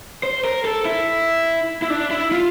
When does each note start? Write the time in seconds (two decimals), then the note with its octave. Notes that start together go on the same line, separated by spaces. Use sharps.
0.23 C5
0.45 A#4
0.65 A4
0.85 E4
1.82 E4
1.90 D4
2.11 E4
2.32 F4